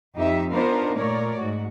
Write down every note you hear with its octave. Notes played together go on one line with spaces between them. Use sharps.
F2 D#4 G4 E5
B3 D4 D#4 F4 A#4 C5
A#2 A3 A#4 C#5 D5
G#2 F#4